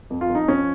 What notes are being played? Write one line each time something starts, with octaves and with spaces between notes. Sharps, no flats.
F2
F4
F2
D#4
F3 C#4